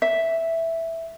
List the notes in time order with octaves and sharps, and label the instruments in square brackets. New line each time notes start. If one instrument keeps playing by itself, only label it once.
[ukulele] E5